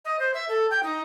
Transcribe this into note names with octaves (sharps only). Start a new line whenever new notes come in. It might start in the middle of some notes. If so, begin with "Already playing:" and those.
D#5
C5
E5
A4
G5
D#4